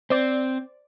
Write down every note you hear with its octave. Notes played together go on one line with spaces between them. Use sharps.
C4 C5 D5